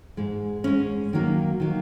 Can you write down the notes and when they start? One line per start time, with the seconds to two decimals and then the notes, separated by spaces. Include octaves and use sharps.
0.17 G#2 G#3
0.64 G#2 G#3 C#4
1.13 D#2 D#3 F#3 A#3
1.60 D#3 F#3 A#3